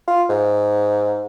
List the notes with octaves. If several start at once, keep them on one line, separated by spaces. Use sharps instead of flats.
F4
G#2